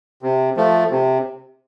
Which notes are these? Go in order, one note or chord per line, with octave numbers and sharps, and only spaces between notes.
C3
F3 A3
C3